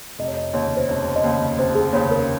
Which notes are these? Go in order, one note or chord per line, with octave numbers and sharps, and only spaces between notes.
F1 D#5
C#5
D#5
D#2 C#3 C#5
C5
F1 C#5
D#5
D#2 C#3 C#5
F1 C5
G#4
D#2 C#3 C#5
A#4